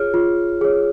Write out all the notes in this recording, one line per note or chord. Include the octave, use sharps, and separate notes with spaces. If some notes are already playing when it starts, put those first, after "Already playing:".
Already playing: F4 G#4 C#5 F6
F4
G#4 C#5